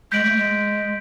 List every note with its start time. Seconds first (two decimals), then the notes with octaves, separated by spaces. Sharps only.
0.12 G#3 G6 B6 D7 F#7
0.24 A3
0.36 G#3